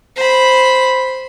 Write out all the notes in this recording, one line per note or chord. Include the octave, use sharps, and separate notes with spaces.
C5 B5